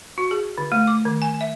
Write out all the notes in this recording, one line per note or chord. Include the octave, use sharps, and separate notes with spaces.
F#4
G#4
D3
A3
D6
D#3
G#5
E5